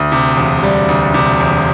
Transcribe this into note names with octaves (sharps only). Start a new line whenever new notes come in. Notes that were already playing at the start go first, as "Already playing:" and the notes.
Already playing: D2
C3
E1
G3
D2
C3
E1